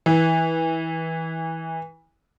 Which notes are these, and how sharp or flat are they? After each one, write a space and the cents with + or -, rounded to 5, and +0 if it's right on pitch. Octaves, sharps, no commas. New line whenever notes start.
E3 -20